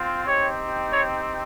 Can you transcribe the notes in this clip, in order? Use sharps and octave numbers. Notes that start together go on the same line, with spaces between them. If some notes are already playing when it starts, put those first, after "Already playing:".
Already playing: C4 F4
C4 D#4 G4 C#5
C#5